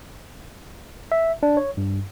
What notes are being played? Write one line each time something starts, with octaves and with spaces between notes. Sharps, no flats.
E5
D4
C#5
G2